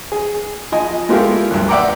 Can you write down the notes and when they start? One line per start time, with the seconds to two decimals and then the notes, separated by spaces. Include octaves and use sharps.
0.12 G#4
0.72 F3 D#5 G#5
1.09 G#3 A3 E4 F4 G4 A#4
1.51 D2 G2
1.68 D5 E5 F#5 G5 A#5 D6